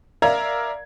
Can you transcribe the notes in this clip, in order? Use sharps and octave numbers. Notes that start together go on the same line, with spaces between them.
A#4 D5 E5 F5 A#5 G#6